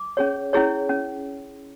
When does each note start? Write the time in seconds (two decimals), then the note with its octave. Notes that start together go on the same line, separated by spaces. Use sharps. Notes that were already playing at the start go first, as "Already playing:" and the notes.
Already playing: D6
0.17 C#4 G#4 C#5
0.53 C#4 E4 G#4 C#5
0.89 C#4